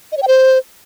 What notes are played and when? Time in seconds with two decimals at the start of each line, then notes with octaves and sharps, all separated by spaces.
0.12 D#5
0.17 C#5
0.22 G5
0.28 C5